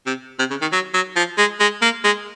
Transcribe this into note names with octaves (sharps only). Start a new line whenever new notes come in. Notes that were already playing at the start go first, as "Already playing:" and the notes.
C3
C3
C#3
D#3
F#3
F#3
F3
G#3
G#3
A#3
G#3